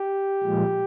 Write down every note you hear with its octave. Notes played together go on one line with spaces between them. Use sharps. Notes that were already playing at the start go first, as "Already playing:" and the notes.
Already playing: G4
A#2 F3 G#3